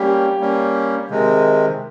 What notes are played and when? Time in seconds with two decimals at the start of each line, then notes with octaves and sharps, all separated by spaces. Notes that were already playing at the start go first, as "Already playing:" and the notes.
Already playing: G3 A#3 C#4 G4
0.40 G3 A#3 C#4
1.10 C3 D#3 G#3